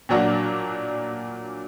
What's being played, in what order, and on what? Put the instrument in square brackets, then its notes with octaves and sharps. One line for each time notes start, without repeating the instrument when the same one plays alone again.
[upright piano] A#2 F#3 A#3 D4 F#4